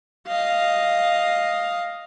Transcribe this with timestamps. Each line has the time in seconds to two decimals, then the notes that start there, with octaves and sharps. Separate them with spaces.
0.28 D#5 F5